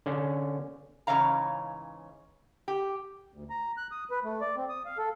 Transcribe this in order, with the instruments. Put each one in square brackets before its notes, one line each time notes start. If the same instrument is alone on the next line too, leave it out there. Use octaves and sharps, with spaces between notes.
[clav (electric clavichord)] D3 C#4
[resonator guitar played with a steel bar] G#2 C#3 E3 C#5 F5 A#5
G4
[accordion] D2
A#5
F#6
D#6
B4
A3
D5
C4
D#6
F5
A4